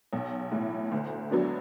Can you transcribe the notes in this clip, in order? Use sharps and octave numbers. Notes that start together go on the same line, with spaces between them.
B1
A2 E3
D2
D3 F#3 B3 D4